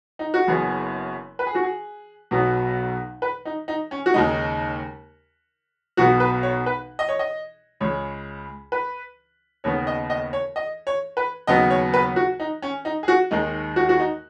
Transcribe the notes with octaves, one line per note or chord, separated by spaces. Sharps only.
D#4
F#4
F#1 F#2 C#3 B3 G#4
B4
G#4
F#4
G#4
B1 B2 F#3 B3
B4
D#4
D#4
C#4
F#4
D#2 C#3 G#3 D#4
B1 B2 B3 F#4
B4
C#5
B4
D#5
C#5
D#5
C#2 C#3 G#3 C#5
B4
D#2 C#3 B3 C#5
D#5
D#5
C#5
D#5
C#5
B4
D#2 C#3 F#3 B3 D#5
C#5
B4
F#4
D#4
C#4
D#4
G#4
F#4
D#2 D#3 G#3 D#4
F#4
F#4
D#4